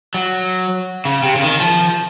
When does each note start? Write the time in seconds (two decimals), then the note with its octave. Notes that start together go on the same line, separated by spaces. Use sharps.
0.14 F#3
1.05 C#3
1.23 C3
1.36 C#3
1.42 D#3
1.60 F3